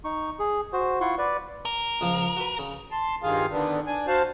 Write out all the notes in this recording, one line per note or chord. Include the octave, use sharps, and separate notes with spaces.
D#4 C#6
G#4
F#4 C5
E4 F4 F#5 C6 C#6
B4 D5
A#4
C#2 F3 F5
F#4 B4
C#3
A5 C6
G2 D#3 F4 G#4 F5
D3 D#3 B3 D4
D4 G#5
F#4 C5 F5 A5